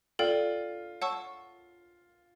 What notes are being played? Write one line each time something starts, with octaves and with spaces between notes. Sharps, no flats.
F4 A4 D5 G5
C#5 F#5 A5 C#6 E6